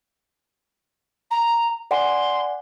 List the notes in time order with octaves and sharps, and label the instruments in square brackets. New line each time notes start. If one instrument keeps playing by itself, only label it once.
[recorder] A#5
[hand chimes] D5 F#5 G#5 [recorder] C6